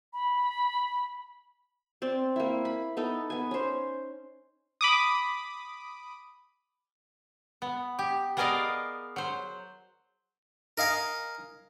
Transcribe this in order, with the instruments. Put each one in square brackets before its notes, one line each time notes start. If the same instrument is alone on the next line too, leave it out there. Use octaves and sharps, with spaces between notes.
[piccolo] B5
[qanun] C4 D5
A#3 E4
B5
B3 D#4 A4
B3 G#5
C#4 C5
[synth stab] B5 D6 D#6
[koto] B3
G4
B3 G#4 A#4 D5 D#5 F5
F#3 C5
[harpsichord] A#4 D#5 F5 G#5 D#6